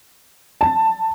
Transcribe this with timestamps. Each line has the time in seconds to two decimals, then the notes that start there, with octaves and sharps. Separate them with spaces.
0.61 A5